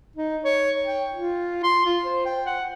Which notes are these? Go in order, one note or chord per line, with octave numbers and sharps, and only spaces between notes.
D#4
C#5
G5
F4
C6
F4
C5
G5
F#5